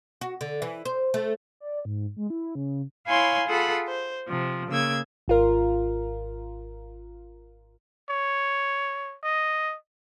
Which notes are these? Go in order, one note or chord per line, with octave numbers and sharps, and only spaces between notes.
F#4
D3
E3
C5
A3
D5
G#2
G#3
E4
C#3
E4 C#5 F5 G#5 B5 C6
F4 G#4 A4 F#5 B5
C5
C3 F3
C#3 A#3 E6 G#6
G#1 F4 A#4
C#5
D#5